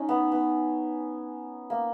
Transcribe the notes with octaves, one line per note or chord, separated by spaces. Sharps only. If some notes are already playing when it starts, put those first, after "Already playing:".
Already playing: C#4 D#4
B3
B3
A#3